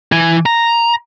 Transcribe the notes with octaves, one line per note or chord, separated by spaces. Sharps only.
E3 G#5
A#5